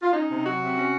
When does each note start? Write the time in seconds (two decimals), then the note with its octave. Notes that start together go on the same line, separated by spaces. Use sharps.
0.02 F4
0.13 C#4 D#4
0.30 C3
0.45 F#3 F#4
0.60 C3
0.76 C#4